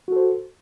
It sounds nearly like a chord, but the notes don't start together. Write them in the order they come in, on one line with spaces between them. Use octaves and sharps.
F#4 A4 C5